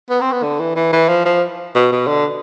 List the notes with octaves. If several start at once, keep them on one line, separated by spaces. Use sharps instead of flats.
B3
C4
B3
D3
E3
E3
E3
F3
F3
B2
B2
D3